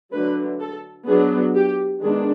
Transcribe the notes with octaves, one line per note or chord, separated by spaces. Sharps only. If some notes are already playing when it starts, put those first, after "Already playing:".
D3 F#3 A3 B4
A4
F#3 B3 D4 G#4
G4
D#3 G#3 B3 D4 G#4